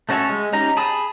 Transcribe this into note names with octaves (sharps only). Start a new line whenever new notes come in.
A3 C#4 F#4 A4 C#5
G#3
C#4 D#4 G4 A#5
G#4 A5 B5 D#6